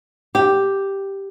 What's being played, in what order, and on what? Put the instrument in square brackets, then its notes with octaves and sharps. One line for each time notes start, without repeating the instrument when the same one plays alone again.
[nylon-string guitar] G4